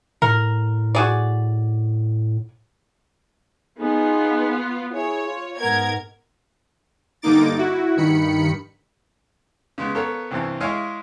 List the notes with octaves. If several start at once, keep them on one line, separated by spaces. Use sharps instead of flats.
A2 A#4
F#4 G#4 D5
B3 D#4 F4 G#4
E4 G#4 C#5
F4
G#2 B3 A#4 G#6
G2 D3 A#3 D#4 D6 A6
E4 F#4
G2 D#3 B5 C#7
C#3 G#3 B3
B3 A4 A#4 C#5 F5
C2 G2 E3 C4 G#5
G#3 E4 G#4 C#5 D#5 F5